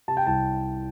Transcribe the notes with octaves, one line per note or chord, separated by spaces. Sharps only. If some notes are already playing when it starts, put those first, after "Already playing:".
C3 A5
G5
C2 A5